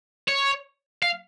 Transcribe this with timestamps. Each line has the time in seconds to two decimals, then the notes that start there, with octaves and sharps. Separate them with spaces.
0.28 C#5
1.03 F5